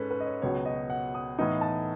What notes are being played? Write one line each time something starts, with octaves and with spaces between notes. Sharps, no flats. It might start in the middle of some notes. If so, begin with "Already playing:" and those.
Already playing: G#2 C#4 A4 B4
B4
D#5
C#5
C#2 B2 F#3 B3 C#5
D#5
F#5
D#6
A2 E3 B3 D#4 D#6
A5